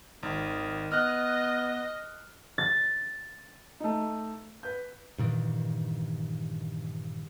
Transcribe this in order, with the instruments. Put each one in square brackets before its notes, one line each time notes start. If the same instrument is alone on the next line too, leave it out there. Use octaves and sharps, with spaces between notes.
[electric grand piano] G#1 [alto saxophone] D#3
[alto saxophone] B3 [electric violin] D#5 [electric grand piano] F6 F#6
[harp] A6
[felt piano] A3 D#4
B4 G6
[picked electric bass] G2 A#2 D#3 E3